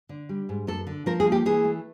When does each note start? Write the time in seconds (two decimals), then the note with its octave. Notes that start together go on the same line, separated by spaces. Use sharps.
0.09 D3
0.29 G3
0.49 G#2
0.67 F#2 A4
0.87 D3
1.06 F3 A#4
1.20 G#4
1.26 A#3
1.32 G4
1.46 E3 G#4
1.64 A3